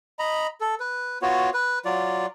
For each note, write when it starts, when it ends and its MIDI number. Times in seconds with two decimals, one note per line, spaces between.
0.19 0.47 75
0.19 0.47 82
0.19 0.47 83
0.61 0.75 69
0.80 1.19 71
1.22 1.50 59
1.22 1.50 65
1.22 1.50 66
1.22 1.50 73
1.54 1.79 71
1.85 2.26 54
1.85 2.26 65
1.85 2.26 74